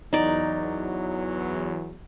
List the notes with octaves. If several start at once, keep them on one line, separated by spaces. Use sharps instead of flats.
E2 F#3 D#4 D5